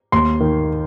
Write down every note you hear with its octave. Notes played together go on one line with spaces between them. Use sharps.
D#2 C6
D#3